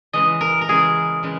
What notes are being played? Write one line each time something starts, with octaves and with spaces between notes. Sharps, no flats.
C#3 E3 G#3 D#5
A#4
A#4
C#3 E3 G#3 G#4
C#3 E3 G#3